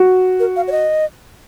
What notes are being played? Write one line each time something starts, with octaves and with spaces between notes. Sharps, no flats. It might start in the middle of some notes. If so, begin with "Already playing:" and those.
Already playing: F#4
A#4
F5
C#5
D#5